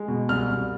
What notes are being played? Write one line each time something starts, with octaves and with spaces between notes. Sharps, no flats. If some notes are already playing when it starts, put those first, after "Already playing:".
Already playing: G#3
B2
C2 F6
C2